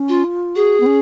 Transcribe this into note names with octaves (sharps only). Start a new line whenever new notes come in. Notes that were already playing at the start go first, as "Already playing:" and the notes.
Already playing: C#4
F4
F4
F#4 G#4
B3
C#4